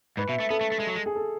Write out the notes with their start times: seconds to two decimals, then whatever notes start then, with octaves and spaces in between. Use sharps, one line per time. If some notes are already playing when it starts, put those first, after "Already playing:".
0.17 G#2 B4
0.28 B2 E5
0.39 A3 E5
0.50 B3 A4
0.61 A3
0.72 A3
0.80 G#3
0.87 F#3
0.95 G#3
1.06 G#4
1.15 A4